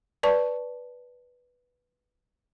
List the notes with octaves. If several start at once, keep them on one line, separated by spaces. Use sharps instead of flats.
B4 D5 A5 C#6